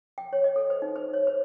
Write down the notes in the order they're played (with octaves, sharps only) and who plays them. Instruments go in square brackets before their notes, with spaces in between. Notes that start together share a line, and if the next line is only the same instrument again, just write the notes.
[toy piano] G5
C#5
D#5
A4
C5
D#4
C5
C#5
C5